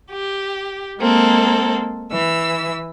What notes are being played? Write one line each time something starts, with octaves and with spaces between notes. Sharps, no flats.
G4
G#3 A#3 C4 A4
E3 E6